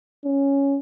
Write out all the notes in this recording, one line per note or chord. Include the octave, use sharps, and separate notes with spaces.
C#4